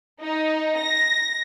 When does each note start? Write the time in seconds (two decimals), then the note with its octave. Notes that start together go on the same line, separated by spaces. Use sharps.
0.20 D#4
0.78 A#6